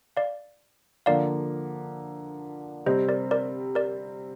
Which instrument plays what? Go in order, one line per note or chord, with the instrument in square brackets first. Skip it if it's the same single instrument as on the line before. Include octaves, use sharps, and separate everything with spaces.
[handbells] D5 F5
[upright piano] D3 F3 A#3 [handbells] D5 F5
[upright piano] C3 G3 C4 [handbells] C5 D#5
[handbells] A#4 D5
A#4 D5
A#4 D5